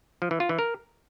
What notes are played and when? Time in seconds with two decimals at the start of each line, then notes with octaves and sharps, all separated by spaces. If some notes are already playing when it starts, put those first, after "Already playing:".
0.22 F3
0.31 E3
0.40 F4
0.49 E3
0.59 A#4